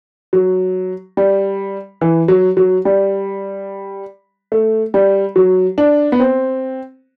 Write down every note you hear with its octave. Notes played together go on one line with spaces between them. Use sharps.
F#3
G3
E3
F#3
F#3
G3
A3
G3
F#3
D4
B3
C4